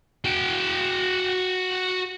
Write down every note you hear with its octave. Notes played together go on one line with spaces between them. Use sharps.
F#4 G5